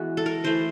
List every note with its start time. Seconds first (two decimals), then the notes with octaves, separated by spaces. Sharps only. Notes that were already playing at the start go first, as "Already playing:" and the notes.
Already playing: E3 G#3 B3 F#4
0.17 A4
0.26 A#4
0.44 E3 A3 C5